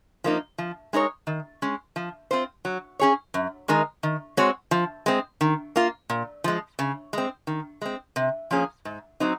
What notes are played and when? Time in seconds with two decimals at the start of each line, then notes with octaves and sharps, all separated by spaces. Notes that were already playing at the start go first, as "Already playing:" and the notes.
0.24 F3 A#3 D#4
0.58 F3
0.93 G#3 D#4 A#4 C#5
1.27 D#3
1.62 G#3 C#4
1.96 F3
2.31 C4 F4 C5
2.65 F#3
2.99 C#4 G#4 C#5
3.34 F#2
3.68 D#3 G#3 D#4 A#4
4.03 D#3
4.37 G#3 C4 F#4 C#5
4.71 F3
5.06 G#3 C4
5.41 D#3
5.76 A#3 F4
6.10 A#2
6.44 F3 G#3
6.79 C#3
7.13 G#3 C4
7.47 D#3
7.82 G#3 C4
8.16 C3
8.51 F3 A#3 C#4 G#4
8.85 G#2
9.20 F#3 C4 D#4